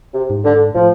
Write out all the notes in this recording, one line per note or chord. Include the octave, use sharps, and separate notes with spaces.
C3
G#2
D3
A2 F3